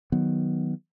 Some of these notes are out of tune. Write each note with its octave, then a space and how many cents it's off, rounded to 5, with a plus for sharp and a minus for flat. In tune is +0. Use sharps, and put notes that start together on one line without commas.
D#3 +0 F#3 +0 B3 -5